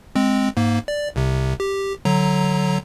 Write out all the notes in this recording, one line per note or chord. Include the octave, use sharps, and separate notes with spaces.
G#3 C4
G#2 A#3
D5
C2 C3
G4
D3 F#3 A#5